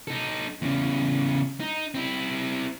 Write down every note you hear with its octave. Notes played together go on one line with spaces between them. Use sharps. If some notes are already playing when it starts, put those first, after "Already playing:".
D#4 A4
E2 C#3
D#4
C4 E4